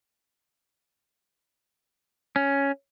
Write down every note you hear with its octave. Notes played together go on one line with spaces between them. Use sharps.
C#4